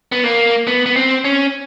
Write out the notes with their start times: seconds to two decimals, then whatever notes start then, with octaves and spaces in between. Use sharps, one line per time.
0.12 B3
0.24 A#3
0.67 B3
0.86 B3
0.96 C4
1.25 C#4